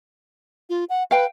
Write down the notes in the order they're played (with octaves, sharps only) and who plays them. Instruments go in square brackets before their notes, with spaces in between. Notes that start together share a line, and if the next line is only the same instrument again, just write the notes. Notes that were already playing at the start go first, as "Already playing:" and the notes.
[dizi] F4
F#5
[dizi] B4 [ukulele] F5 G5